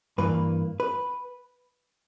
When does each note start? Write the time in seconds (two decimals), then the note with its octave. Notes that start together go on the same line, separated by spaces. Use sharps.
0.18 G2 E3 A#3 B4
0.80 B4